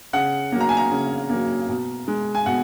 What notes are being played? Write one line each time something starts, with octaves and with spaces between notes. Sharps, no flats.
C#3 F#5
F#3 A#3
A#5
G#5
A#5
C#3
F#3 A#3
B2
G#3
G#5
B2 F#5